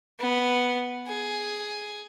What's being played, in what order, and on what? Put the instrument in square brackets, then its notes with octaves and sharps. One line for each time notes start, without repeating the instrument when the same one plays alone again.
[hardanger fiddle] B3
G#4